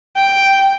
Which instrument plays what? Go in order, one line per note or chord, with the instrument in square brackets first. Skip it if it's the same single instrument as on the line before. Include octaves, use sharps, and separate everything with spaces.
[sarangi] G5